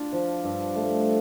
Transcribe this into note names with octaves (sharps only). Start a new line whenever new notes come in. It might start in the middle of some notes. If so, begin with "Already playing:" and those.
Already playing: D4 F4
F3
G2
A3